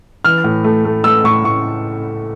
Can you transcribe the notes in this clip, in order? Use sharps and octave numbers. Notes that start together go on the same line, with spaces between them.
E3 F6
A2
A3
A3
A3 E6
A2 C#6
A2 C#6